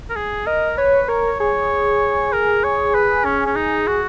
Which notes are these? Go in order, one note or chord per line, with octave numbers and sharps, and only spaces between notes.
A#4
G#4
A#4 D#5
B4 C#5
A#4 C#5
G#4 C#5
A#4
C#5
B4
C#4
C#4
D#4
F#4